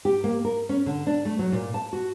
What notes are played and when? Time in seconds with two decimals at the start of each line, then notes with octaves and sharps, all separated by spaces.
0.05 G4
0.24 A#3
0.45 A#4
0.69 C#4
0.86 D3
1.07 D4
1.25 A3
1.39 F#3
1.52 A#2
1.74 A5
1.93 F#4